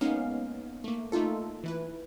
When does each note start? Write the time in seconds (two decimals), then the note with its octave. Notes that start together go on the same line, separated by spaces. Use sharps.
0.01 G#3 A#3 B3 C#4 D#4 F5
0.84 A3 A#3
1.12 A3 A#3 D#4 F4 A4
1.64 E3 E4 B4